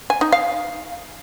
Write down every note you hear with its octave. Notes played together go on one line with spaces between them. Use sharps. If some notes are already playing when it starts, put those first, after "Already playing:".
G#5
D#4
F5